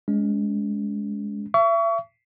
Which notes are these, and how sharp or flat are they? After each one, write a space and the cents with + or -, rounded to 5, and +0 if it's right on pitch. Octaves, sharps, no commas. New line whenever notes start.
G#3 +0 C#4 +35
E5 +35 C#6 +35